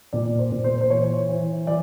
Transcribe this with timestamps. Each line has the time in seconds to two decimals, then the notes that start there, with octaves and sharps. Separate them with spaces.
0.13 A#2 D5
0.39 C5
0.52 A#2
0.64 C5
0.81 C5
0.90 E3 C#5
1.29 E3
1.67 E3 D5